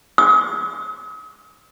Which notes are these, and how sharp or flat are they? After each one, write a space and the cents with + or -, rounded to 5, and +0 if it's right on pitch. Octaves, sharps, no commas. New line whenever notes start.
D#6 +40